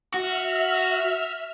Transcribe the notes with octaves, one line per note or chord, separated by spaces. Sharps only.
F#4 E5 F6